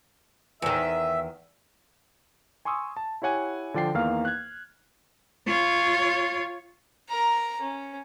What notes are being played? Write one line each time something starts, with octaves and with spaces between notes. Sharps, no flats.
E2 D#3 E5
G#5 C6 C#6 D#6 E6
A5
E4 G4 C#5 F#5 G#5
D3 F3 D5 G5 C7
E2 D#3 A#3 F5 F6
F#6 G#6
F4 C#5
A#4 A#5
C#4